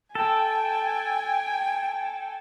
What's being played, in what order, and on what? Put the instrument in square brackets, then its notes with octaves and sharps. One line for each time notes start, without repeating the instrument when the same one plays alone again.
[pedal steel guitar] A4 [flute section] G5 [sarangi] G#5